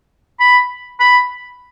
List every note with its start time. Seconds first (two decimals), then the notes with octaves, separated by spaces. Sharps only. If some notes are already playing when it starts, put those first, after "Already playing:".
0.40 B5
1.00 B5